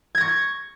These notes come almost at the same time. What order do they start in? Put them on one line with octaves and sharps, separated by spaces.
G#6 A#6 C#6